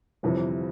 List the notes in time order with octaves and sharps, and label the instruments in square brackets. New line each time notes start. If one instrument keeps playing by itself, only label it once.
[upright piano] G1 F2 C3 E3